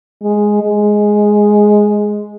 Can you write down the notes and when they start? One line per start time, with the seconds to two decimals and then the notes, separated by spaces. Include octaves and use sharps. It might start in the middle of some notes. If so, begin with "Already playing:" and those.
0.23 G#3
0.62 G#3